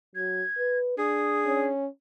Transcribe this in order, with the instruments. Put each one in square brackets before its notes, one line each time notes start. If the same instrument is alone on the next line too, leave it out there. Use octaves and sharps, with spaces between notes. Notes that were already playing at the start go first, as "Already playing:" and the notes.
[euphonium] F#3 [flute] G#6
[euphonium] B4
[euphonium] D4 [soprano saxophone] G#4 [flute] D#6
[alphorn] C#4